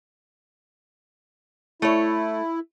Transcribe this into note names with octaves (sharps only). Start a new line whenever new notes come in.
A3 E4 C#5